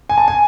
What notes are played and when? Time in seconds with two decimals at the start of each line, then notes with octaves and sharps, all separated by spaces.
0.09 G#5
0.18 A5
0.28 G#5